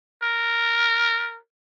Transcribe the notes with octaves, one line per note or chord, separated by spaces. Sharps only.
A#4